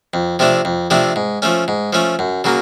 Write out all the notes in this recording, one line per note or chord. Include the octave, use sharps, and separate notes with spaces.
F2
C3 F3 A3 D4
F2
C3 F3 A3 D4
G#2
F3 A3 C#4
G#2
F3 A3 C#4
F#2
C#3 F#3 A#3